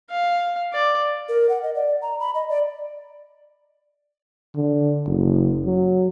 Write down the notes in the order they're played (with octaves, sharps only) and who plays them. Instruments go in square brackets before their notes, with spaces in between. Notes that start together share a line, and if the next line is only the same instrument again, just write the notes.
[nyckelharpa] F5
D5
[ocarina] A#4
F#5
D#5
D5
A#5
B5
D#5
D5
[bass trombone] D3
F#1
F#3